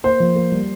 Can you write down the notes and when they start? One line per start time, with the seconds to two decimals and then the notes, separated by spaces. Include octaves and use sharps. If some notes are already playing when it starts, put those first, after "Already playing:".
0.04 A#3 C5
0.20 F3
0.36 A#3
0.52 G3